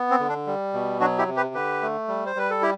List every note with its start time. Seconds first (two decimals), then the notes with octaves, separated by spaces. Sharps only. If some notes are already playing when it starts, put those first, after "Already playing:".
Already playing: B3
0.10 C4
0.20 D3
0.29 D4
0.47 G3
0.73 B2
1.00 F#3 D4 F#4
1.18 E4 G4
1.27 C3
1.36 G4 B4
1.54 D3 G4 B4
1.82 A3
2.08 G3
2.26 C5
2.36 G3 B4
2.50 A4
2.62 E4 G4